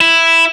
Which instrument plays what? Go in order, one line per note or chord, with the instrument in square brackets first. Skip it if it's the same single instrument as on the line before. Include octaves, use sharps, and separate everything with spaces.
[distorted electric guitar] E4